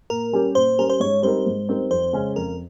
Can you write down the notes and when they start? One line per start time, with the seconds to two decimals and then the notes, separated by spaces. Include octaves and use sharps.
0.10 A#2 A#4
0.33 G3 C#4 G4
0.55 A#2 C5
0.78 G3 C#4 G4 A#4
0.90 C5
1.00 G#2 C#5
1.22 G3 C4 D#4 A#4 C5
1.46 G#2
1.69 G3 C4 D#4 A#4
1.90 F2 C5
2.13 C#3 G#3 C#4
2.36 F2 A#4